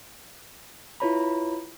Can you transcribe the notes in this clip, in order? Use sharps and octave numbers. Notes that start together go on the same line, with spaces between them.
E4 F4 B4 C#5 A#5 B5